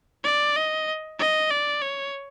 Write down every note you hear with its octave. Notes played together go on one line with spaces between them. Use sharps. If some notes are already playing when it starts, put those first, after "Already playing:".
D5
D#5
D#5
D5
C#5